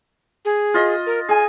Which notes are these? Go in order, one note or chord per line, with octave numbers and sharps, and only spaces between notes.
G#4
F4 D#5
A#4
G#4 G#5